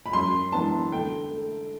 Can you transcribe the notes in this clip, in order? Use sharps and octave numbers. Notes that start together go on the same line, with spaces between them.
B5
F#2 C6
E3 B3 D4 A5
D3 G5
A3